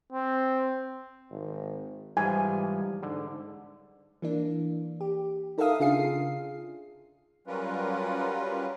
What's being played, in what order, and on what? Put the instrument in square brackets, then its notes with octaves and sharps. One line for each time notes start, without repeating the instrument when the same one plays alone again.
[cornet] C4
[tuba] G#1
[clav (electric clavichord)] G#2 E3 F3 [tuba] G3 [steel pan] G#5
[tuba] G#2 [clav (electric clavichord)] D3
[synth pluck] E3 A#3 D4
G4
D#4 A4 A#4 E5 F5 D#6
C#3 D4 F4 G#4 F5 C7
[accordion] F#3 G3 C#4 F4 A#4 B4